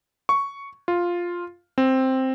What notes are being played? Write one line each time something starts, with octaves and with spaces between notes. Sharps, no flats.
C#6
F4
C4